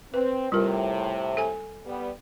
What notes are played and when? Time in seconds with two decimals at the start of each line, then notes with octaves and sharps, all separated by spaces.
0.14 C4 B4
0.52 A2 C3 G3 F4 A#4
1.37 A4 G#5
1.85 G3 B3